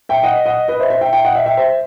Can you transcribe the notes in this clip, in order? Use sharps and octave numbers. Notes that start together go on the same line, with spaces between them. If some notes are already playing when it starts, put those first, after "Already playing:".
E5 G5
D#5 F#5
D#5 F#5
B4 D#5
C5 E5
C5 E5
E5 G5
E5 G5
D#5 F#5
E5 G5
E5 G5
C5 E5